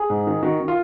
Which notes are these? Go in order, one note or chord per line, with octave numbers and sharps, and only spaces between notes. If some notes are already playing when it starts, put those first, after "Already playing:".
Already playing: G#4
G#2
D#3
D#3 F#4
D#3
F4